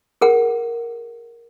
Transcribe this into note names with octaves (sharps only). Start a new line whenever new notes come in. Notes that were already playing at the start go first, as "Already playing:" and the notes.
G#4 A#4 F#5